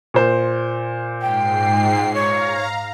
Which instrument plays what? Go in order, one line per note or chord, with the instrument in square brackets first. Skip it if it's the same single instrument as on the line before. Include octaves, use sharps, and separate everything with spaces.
[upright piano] A#2 C5
[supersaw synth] G#2 C7 [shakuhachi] G5
[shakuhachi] C#5 [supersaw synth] F5 A#5